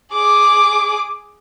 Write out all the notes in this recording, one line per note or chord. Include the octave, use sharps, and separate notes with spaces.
G#4 D6